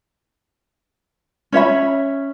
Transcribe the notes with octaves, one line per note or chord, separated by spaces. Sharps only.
C#4 C#5 E5 B5